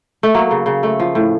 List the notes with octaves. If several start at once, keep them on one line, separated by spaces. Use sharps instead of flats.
A3
F#3 A#3
C#3
C#3
A3
F3
A2